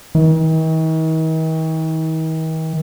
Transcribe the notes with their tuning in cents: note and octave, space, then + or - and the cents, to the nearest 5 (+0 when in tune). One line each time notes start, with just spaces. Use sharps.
D#3 +45